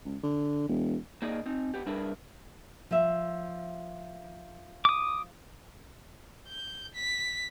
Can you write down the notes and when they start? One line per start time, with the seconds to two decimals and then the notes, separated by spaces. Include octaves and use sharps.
0.05 C#2
0.23 D3
0.69 E1
1.22 A#3 D#4 G#4 D5 D#5
1.46 C4 D#4
1.74 B3 G4
1.86 G3 D4 E4 G#4 A#4 B4
2.91 F3 E5
4.85 D6 D#6
6.48 G6
6.95 B6